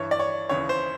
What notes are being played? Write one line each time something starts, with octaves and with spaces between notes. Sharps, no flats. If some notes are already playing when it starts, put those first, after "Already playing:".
Already playing: G2 E3 C#5
D5
C#5
D#2 C#3 E3 C#5
C5